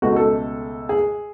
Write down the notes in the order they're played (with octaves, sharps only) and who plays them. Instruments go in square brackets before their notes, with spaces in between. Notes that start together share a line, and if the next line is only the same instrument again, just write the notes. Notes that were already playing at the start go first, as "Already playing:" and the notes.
[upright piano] C#2 B2 A3 F#4
A4
G#4